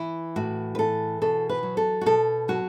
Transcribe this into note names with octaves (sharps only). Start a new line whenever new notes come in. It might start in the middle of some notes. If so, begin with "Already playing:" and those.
Already playing: E3 E4
A2 F#4
B4
E3 A4
B2 A4
B4
F#3
A4
F#4
B2 A4
F#3 F#4